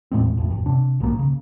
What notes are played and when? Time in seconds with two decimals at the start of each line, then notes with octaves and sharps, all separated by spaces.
0.12 E1 A2 G#3 C4
0.38 G#1 F2 A2
0.50 E1 G2
0.66 C3 D4
1.00 B1 G#2 E3 A#3
1.19 C#3